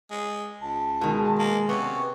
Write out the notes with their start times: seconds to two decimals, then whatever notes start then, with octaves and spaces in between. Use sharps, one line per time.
0.11 G#3
0.61 C#2 A5
1.01 B2 D#3 G#3
1.39 A#3
1.69 C3 B3 C#4 C#6